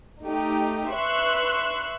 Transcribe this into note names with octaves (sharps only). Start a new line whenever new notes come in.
A3 D#4 G4
B4 E5 C6 C#6 E6 F#6